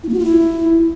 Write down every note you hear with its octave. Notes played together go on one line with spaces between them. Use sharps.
E4
A#3
F#4
F4
E4